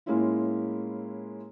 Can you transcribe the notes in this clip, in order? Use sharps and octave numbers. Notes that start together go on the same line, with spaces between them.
A2 G#3 A#3 C#4 E4 F4